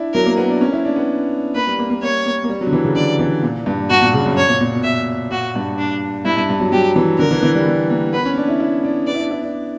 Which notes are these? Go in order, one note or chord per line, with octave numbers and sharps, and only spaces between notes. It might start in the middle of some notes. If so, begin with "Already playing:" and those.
Already playing: D4 E4
F#3 A#4
A#3
B3
D4
C#4
E4
D4
B3
A#3 B4
G3
A#3
A#3
A#3 C#5
A#3
A#3
G3
F#3
D3
E3
C#3
D3 D5
E3
A#2
G2
G2 F#4
A#2
C#3
F#2
C#5
A#2
A#2
B2
B2 E5
A#2 F#4
G2
D4
G2 E4
G2
G2
F#3
F#3 G4
E3
D3 A#4
E3
E3
G3
G3
A#3
B3 B4
C#4
D4
E4
E4
D4
B3 D5
E4
D4
E4
D4